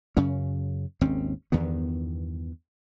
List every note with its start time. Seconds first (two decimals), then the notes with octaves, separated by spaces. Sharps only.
0.17 F#2 C#3 C#4
1.01 G#1 D#2 C4 C#4
1.52 E2 G2 D#3 B3